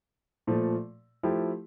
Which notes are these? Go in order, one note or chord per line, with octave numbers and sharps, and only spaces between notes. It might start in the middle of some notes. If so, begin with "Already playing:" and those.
A#2 F3 A3
F3 A3 E4 G4